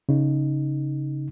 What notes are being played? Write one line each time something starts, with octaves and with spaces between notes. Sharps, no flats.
C#3 D#4